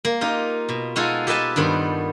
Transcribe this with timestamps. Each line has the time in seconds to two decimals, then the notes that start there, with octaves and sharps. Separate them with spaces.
0.05 A#3
0.21 D#4 F4 G4
0.69 B2
0.96 G#3 D#4 F4 F#4 G#4 A4
1.27 G4 A4 B4 D#5 G#5 A5
1.56 G2 D#3 B3 C5